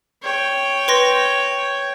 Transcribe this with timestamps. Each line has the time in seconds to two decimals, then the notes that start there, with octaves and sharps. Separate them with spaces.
0.22 C#5 G5
0.88 B4 C6 A#6